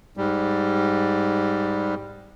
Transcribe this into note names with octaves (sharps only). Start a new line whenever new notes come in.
G#2 G3